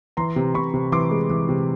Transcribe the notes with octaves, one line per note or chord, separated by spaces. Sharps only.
E3 A#5 C6
C3
C3 B5 C#6
C3
E3 C6 D6
G#3
E3
C3